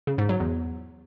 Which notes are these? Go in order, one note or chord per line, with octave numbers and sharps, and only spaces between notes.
C#3
G#2
F#3
E2